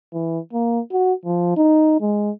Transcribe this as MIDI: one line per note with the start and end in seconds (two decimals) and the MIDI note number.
0.13 0.39 52
0.53 0.80 58
0.92 1.13 66
1.25 1.54 53
1.57 1.97 63
2.01 2.31 56